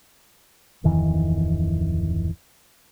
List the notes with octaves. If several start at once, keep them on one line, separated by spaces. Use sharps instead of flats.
D1 F2 D#3 E3